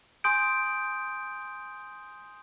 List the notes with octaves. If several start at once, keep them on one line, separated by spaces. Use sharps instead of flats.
G#5 C6 D#6 G6 D7